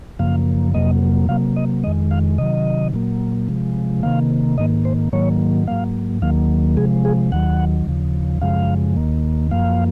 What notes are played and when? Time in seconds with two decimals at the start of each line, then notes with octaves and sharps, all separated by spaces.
0.19 F#2 C#3 F3 A#3 F5
0.74 F2 C3 F#3 A#3 D#5
1.29 C3 F#3 A#3 F5
1.56 D#5
1.84 F2 D#3 G#3 D#5
2.11 F5
2.38 C3 D#3 F#3 D#5
2.94 A#2 F#3 A#3
3.48 C3 F3 G#3
4.03 C3 D#3 A#3 F5
4.58 G#2 D#3 A#3 D#5
4.85 C5
5.12 G#2 D#3 F#3 A#3 C#5
5.67 G#2 F#3 A#3 F5
6.22 D#2 D#3 F#3 A#3 F5
6.77 C3 F3 G#3 G#4
7.05 G#4
7.32 D#2 D#3 F#3 F#5
7.87 D#2 C#3 F3
8.41 F#2 C#3 F3 G#3 F5
8.96 D#2 D#3 A#3
9.51 F#2 F3 A#3 F5